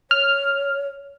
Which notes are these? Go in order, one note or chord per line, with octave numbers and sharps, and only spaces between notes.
C#5 F6